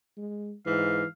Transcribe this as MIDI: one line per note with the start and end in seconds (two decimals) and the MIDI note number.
0.17 0.54 56
0.66 1.02 44
0.66 1.06 52
0.66 1.04 77